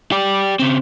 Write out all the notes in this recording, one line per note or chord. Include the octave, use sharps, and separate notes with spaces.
G4 D5
C#3 C4